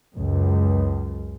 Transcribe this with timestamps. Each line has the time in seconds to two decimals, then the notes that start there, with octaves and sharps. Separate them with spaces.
0.15 C#2 F#2